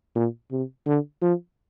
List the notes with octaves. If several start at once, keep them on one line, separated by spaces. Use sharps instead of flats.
A#2
C3
D3
F3